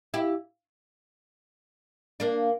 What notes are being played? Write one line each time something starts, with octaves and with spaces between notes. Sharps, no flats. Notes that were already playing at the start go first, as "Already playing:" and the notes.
E4 G4
A#3 D4